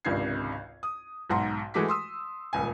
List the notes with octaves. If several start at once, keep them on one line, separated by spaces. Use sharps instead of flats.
G#1 C#2 C3 D4 G#6 C7
D#6
B1 G#2 F#5 A#5 C6
E3 G#3 A3 F#4 D6 B6
C6 D#6 E6
D#1 C#2 G#5